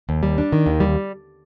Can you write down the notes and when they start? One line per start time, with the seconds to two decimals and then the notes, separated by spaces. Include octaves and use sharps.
0.09 D#2
0.23 G3
0.38 D4
0.53 D#3
0.66 D#2
0.80 G3